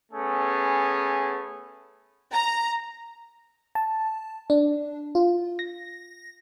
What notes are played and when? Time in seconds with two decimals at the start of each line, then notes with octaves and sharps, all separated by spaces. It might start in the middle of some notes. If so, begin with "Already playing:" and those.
0.12 A3 B3 C#4 G#4
2.32 A#5
3.75 A5
4.50 D4
5.15 F4
5.59 A#6